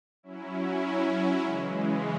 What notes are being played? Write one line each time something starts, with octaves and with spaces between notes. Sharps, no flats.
F#3 C#4 E4
C#3 E3 G#3